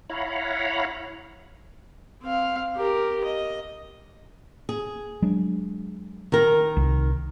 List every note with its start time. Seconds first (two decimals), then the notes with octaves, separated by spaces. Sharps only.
0.10 E4 C#5 F5 F#5 A#5 B5
2.23 C4 F5
2.76 G4 A#4
3.25 D#5
4.69 G#4
5.22 F#3 G#3 D4
6.32 D#3 A#4
6.77 C2